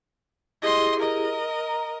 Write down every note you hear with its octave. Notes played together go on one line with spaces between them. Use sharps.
E4 G4 G#4 D#5 C6
A#4 D#5
A#5